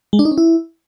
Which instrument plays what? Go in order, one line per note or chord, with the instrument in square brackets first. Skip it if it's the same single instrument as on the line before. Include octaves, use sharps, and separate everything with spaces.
[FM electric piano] G#3
D4
D#4
C#4
E4